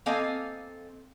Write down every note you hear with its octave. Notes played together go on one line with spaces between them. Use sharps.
A#3 C4 A4 D#5 F5 G#5